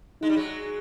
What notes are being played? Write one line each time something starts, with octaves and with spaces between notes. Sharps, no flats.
G#3 D#4
G3
F#3 G#3